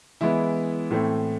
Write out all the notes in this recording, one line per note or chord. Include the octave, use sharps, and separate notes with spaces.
E3 G#3 B3 E4
A2 E3 A3 C4